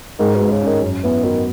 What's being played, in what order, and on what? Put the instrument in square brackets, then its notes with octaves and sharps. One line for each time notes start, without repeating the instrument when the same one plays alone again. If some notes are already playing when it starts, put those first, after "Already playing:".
[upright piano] G#2 [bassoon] D#3
[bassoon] B2
[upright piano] G#2
[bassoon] C#3
[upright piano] C#4
[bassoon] D#3
[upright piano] F#2
[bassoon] E3 [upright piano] B3
[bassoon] D#3 [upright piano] F#3